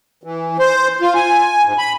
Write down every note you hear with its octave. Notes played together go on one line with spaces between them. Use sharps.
E3
C5
F4
G#5
G#2
B5